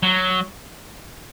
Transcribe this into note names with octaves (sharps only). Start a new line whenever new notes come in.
F#3